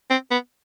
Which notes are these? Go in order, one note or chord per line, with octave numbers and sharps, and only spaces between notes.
C4
B3